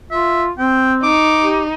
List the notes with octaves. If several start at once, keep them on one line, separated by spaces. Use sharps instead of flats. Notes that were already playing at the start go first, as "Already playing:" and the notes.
F4 E5
C4 G5
D#4 D6
G4